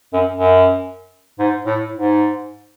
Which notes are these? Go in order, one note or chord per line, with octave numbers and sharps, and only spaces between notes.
F#2
F#2
G#2
A2
G#2